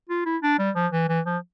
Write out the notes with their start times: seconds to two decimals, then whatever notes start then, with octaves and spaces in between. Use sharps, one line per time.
0.09 F4
0.25 E4
0.42 D4
0.58 G3
0.75 F3
0.92 E3
1.08 E3
1.26 F3